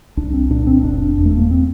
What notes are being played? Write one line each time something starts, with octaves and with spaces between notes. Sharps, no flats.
C2 D4
C4
A#2 D4
C4
F1 D4
E2
A3
A#3
C4